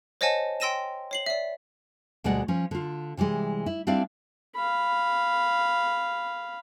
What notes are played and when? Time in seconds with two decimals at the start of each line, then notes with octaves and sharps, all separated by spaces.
0.21 C5 C#5 D#5 F#5 G#5 A5
0.60 G5 C6 E6 A#6 D#7 E7
1.11 C#5 C7 F#7
1.26 D5 E5
2.24 D2 B2 G3 G#3 D5 F#5
2.48 F3 C#4
2.71 D3 F4
3.17 C3 E3 G3 G#3
3.66 E4
3.87 G3 C4 D4 E4 D5 F5
4.55 F5 B5